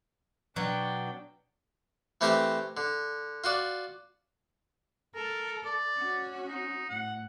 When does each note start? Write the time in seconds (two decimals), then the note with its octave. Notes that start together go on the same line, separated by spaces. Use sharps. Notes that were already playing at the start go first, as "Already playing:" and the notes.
0.56 B2 F#3 D4 F#4 G5
2.21 E3 A3 C4 G4 A#4 A#5
2.77 D3
3.44 F4 F#4 D5
5.15 A4 A#4
5.65 D5
5.98 C#4 F#4
6.48 D#4
6.89 A2 F#5